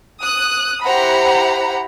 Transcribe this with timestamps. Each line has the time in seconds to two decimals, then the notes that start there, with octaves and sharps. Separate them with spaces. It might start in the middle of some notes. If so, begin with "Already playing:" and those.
0.22 D#6 F#6
0.83 E4 G4 C5 F#5 A#5 B5